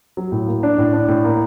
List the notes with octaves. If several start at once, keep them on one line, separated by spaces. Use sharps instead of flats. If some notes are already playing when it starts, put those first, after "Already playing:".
F#3
A2
A#3
D4
A2
D4
A2
A#3